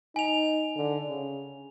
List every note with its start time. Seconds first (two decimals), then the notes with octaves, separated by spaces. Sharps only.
0.16 D#4 G#5 F7
0.76 D3
1.08 C#3